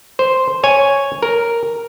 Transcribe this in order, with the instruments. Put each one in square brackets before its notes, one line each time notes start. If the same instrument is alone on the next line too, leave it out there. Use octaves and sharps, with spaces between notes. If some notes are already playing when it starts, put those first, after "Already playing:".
[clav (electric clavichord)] C5
C#5 G#5
A#4